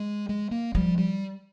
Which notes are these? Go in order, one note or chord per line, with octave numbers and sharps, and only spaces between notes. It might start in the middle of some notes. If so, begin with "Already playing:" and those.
Already playing: G#3
G#3
A#3
F3 G3
G3